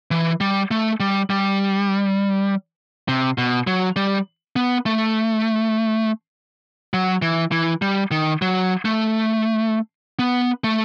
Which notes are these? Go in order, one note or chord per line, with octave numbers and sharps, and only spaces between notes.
E3
G3
A3
G3
G3
C3
B2
F#3
G3
B3
A3
F#3
E3
E3
G3
D#3
F#3
A3
B3
A3